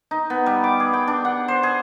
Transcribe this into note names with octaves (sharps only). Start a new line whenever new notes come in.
D#4
B3
G3
D6
G#4
G5
D4
F#5
C5
G#4